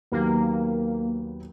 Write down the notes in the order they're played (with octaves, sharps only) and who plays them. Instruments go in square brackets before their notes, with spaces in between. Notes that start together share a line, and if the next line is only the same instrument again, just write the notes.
[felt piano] D#2 F#3 B3 [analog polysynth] A#3